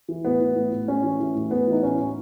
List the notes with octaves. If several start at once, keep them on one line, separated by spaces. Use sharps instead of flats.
E3
A2 B3
E3
A2
A2
A2 C#4
E3
E3
A2
A2 B3
E3
D#4
A2 C#4
A2